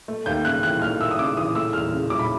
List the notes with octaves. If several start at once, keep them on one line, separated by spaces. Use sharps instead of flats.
A3
D#2 G6
C#3 F#6
E3 F#6
A3 F6
D#2 E6
D#6
C#3 D6
E3 D#6
A3 E6
E2 F6
C#3
F#3 D6
B5